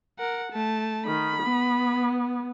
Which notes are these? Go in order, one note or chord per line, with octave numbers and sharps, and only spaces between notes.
A#4 F#5
A3 A5
D#3 B5
B3